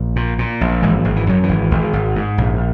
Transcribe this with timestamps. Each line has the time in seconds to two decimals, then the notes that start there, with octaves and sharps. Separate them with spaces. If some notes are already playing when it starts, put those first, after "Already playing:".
Already playing: A#1
0.16 A#2
0.39 A#2
0.61 A#1
0.82 G#1 E3 G#3
1.04 G#1
1.16 E3
1.27 F#2 F#3
1.43 E3
1.49 G#1
1.71 G#1
1.93 G#1
2.16 G#2
2.38 A#1